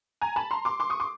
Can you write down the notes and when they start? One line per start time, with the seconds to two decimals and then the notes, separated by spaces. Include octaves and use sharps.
0.21 G#5 A#5
0.36 A5 B5
0.51 A#5 C6
0.65 C6 D6
0.80 C6 D6
0.90 C#6 D#6
1.00 C6 D6